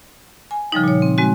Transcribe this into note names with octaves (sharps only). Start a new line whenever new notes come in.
G#5
C#3 F3 G3 D#4
A#2 C#5
C4
G#3 C4 F#4